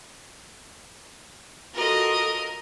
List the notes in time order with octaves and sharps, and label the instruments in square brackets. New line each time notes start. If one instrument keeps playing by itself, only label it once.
[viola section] F4 F#4 A4 [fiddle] A#4 D#5